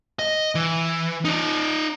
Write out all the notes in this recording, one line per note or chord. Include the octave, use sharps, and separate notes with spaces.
D#5
E3
D#4 D5